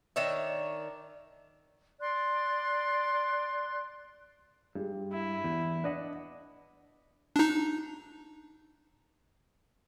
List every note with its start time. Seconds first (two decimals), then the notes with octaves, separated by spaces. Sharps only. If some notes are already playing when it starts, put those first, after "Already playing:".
0.16 D#3 D4 C#5 E5
2.01 D5 C6 F#6
4.75 G2 G3 G#3
5.13 E4
5.44 E2
5.84 D4 B4 D#5 F#5
7.36 D4 D#4